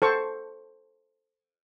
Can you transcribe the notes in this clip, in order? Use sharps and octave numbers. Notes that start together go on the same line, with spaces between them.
A4 C5 C#6